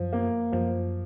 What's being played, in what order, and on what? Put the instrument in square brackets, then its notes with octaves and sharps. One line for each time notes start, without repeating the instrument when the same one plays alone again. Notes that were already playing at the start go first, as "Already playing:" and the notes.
Already playing: [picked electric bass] F#2 [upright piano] F3
[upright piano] A#3
[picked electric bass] F#2 [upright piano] F3